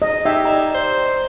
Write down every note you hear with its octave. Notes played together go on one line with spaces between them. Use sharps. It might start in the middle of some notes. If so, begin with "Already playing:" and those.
D#5
D#4 G4 E5
D5 D#5 A#5
C5